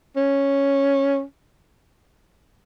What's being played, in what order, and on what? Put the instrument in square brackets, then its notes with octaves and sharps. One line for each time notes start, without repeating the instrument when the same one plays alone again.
[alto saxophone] C#4